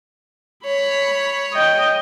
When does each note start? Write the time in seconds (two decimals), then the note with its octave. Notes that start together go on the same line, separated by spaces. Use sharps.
0.65 C#5 B5
1.53 D#5 G5